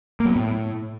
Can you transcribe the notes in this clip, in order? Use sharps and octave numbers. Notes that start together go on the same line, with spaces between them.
A#3
F#3
B3
A2